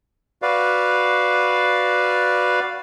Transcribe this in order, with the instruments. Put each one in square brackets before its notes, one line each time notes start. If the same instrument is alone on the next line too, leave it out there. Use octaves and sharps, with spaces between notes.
[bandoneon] F#4 B4 D5 F5